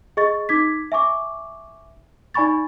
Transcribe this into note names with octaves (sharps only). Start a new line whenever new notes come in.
G#4 D#5 C#6 A6
D#4 D6 G#6 B6
E5 G#5 C#6 D6
D#4 D5 G#5 B5 C#6 A6